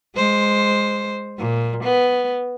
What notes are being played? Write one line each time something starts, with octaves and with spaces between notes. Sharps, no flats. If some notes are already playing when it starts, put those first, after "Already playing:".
G#3 C5
A#2
B3